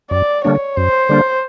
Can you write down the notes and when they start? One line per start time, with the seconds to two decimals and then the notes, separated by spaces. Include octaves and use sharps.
0.11 F#2 D5
0.44 D3 G3 A#3 D4 C#5
0.77 F#2 C5
1.09 D3 G3 A#3 D4